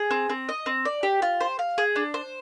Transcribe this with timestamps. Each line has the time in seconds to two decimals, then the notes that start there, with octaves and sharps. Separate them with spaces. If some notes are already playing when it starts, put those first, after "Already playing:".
Already playing: G#4
0.11 C4
0.29 C4
0.49 D#5
0.66 C4
0.85 D5
1.03 G4
1.22 F4
1.40 C5
1.59 F5
1.78 G#4
1.96 D4
2.14 C5